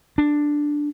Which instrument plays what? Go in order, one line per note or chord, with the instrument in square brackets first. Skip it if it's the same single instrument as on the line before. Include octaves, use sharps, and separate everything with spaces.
[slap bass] D4